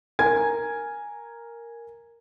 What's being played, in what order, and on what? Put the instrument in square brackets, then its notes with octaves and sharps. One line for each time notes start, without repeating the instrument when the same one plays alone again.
[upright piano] A#4 G#5 G#6